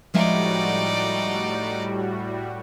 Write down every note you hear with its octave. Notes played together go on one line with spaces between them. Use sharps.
A2 F3 G3 G#3 D#4 F#4 D5 E5